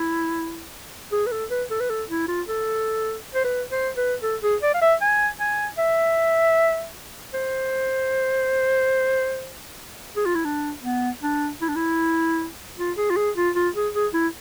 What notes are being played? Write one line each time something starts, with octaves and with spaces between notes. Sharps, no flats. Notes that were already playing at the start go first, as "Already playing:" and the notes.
Already playing: E4
G#4
B4
A4
B4
A4
B4
A4
E4
F4
A4
C5
B4
C5
B4
A4
G#4
D5
F5
E5
G#5
G#5
E5
C5
G#4
F4
E4
D4
B3
D4
E4
D4
E4
F4
G#4
F4
G#4
F4
F4
G#4
G#4
E4